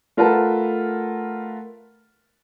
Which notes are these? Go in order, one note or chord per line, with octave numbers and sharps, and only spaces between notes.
A3 F4 A#4 B4 F#5 A5